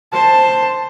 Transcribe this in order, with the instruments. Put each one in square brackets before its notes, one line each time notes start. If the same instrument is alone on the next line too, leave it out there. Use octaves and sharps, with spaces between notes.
[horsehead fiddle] C5 A5